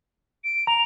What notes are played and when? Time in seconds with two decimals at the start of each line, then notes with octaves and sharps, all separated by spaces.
0.44 D7
0.67 A#5 F7